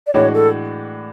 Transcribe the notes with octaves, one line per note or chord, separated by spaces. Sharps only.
D5
A2 E3 G#3 D4 F#4 C#5
A4